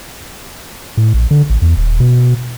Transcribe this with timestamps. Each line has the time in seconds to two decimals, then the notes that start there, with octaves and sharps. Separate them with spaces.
0.97 A2
1.14 A#1
1.31 D3
1.50 A1
1.62 E2
1.77 D#1
2.00 B2